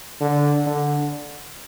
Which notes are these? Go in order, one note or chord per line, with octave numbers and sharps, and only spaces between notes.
D3
D3